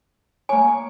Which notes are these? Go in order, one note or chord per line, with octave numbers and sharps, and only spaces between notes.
A#3 C#5 G#5